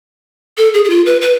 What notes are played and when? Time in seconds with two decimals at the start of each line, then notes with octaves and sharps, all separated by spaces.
0.58 A4
0.74 G#4
0.85 G#4
0.90 F4
1.06 B4
1.21 B4